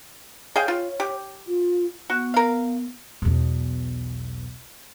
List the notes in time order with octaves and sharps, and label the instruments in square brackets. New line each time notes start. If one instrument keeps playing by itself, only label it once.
[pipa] G#4 F5 G5 [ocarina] C#5
[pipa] F4
G4
[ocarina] F4
[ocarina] B3 [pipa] F#4
[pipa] A#4 F5
[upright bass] B1 E2